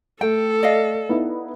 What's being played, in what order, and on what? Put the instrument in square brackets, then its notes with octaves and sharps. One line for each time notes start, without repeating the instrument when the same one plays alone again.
[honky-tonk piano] A3 [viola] A4 [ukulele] G5
[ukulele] D5 D#5 F5
[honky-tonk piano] B3 D#4 E4